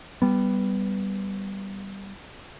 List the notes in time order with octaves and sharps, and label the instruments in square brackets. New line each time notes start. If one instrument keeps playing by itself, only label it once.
[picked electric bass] G3 B3